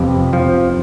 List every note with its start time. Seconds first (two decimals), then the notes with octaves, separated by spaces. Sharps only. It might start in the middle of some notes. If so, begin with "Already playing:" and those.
Already playing: F2 C3 G4 B4
0.33 F3